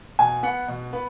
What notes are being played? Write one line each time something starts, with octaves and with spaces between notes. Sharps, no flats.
B2 G#5
B3 F#5
B2
B3 B4